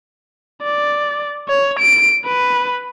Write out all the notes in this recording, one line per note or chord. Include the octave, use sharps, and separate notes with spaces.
D5
C#5
D7
B4